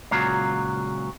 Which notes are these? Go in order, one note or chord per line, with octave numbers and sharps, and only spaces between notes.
C#2 A#2 F#3 F5